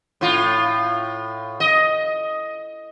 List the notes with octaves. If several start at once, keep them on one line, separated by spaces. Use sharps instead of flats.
A2 F4
D#5